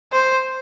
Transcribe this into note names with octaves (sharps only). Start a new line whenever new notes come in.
C5